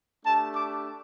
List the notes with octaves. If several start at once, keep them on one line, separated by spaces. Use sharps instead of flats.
A3 D4 G4 A5
D6